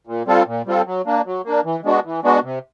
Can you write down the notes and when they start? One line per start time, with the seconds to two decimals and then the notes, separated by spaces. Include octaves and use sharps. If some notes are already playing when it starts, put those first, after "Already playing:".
0.07 A#2
0.26 G3 C4 F4 A4
0.46 A#2
0.66 G3 C4 F4 A4
0.86 F#3
1.06 A#3 D4
1.26 F#3
1.45 A#3 D4
1.65 E3
1.84 G#3 B3 D4 F#4
2.05 E3
2.23 G#3 B3 D4 F#4
2.43 C3